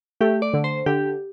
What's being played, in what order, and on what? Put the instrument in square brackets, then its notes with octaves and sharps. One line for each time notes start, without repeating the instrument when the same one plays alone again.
[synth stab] A3 [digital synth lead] G4
[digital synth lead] D5
[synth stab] D3
[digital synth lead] C5
[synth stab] D3 [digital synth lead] G4